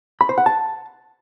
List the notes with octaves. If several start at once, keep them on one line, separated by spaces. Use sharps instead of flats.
B5
C5
F#5
A5